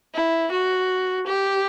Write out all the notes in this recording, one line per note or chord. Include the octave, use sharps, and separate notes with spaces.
E4
F#4
G4